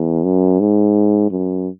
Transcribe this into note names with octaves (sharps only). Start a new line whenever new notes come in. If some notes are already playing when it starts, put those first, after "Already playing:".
Already playing: E2
F#2
G#2
F#2